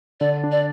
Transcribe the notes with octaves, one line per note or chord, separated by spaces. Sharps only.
D3 D5
D4
D5